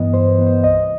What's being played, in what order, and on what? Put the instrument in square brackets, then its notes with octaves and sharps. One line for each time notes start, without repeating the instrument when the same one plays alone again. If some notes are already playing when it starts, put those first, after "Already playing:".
Already playing: [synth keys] G2 E3 B3 D#5
G2 C5
E3 B3
C5
C2 D#5